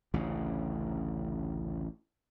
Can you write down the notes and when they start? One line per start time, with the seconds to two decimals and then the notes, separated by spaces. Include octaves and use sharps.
0.14 A1 D2 C#3